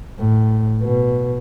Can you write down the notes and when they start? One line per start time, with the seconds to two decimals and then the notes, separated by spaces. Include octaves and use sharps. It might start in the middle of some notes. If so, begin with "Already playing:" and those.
0.19 A2
0.82 B2